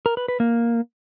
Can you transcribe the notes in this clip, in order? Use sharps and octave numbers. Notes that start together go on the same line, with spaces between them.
A#4
B4
B4
A#3